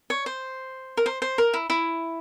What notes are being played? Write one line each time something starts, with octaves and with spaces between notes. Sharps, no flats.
C#5
C5
A#4
C5
C5
A#4
E4
E4